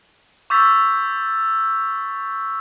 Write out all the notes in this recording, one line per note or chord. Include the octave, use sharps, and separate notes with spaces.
C#6 D6 E6 G6 A6 B6